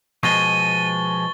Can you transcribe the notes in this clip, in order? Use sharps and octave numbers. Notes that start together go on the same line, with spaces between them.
B2 F3 G#3 C#6 A6 D#7 G7